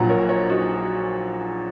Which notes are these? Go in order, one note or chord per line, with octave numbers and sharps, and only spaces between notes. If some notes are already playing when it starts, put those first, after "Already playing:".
Already playing: A#1 A#2 F#3 F#5 A#5
A#4 C#5
A#4 C#5
D#4 F#4